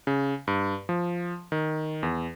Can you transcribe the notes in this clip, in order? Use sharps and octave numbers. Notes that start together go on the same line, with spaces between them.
C#3
G2
F3
D#3
E2